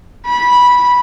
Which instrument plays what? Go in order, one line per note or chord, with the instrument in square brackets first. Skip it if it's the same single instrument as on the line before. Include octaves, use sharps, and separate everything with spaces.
[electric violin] B5